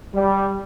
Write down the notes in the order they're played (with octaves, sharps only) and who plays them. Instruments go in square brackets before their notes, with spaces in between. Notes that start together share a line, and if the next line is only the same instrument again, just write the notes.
[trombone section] G3